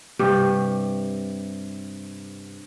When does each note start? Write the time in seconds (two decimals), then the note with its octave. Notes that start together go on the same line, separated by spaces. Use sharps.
0.19 G2 C3 G4